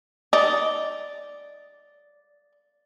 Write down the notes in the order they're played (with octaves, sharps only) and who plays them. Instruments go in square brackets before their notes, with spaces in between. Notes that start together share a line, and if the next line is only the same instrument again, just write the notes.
[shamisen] D#4 [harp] D5